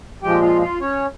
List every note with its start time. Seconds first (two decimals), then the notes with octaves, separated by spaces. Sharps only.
0.23 A#2 F3 G#3 G4 G5
0.42 F4 F5
0.61 F4 F5
0.80 C#4 C#5